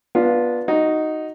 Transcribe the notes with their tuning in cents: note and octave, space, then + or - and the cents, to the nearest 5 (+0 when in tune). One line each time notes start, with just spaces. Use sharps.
B3 -20 D4 +0 F4 +0
D#4 +0 F#4 +5